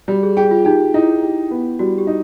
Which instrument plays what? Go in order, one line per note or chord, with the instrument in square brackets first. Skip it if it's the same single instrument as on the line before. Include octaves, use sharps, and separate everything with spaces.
[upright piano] G3 [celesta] F#4
[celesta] G#4
[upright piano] G4 [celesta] G#4
[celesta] F4
[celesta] D#4 [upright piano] G4
[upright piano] D#4 [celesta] E4
[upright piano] G4
B3
[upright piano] G3 [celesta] F#4
[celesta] G4
[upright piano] D#4